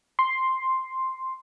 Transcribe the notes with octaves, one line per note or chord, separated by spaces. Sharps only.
C6